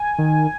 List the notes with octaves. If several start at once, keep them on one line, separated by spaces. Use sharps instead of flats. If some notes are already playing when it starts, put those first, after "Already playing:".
Already playing: G#5
D#3